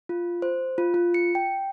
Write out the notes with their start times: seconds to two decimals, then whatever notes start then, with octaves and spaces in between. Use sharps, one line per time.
0.09 F4
0.42 C5
0.78 F4
0.94 F4
1.14 C#7
1.35 G5